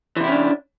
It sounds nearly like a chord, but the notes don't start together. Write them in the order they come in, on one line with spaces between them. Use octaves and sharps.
E3 C3 E4 C#4 D4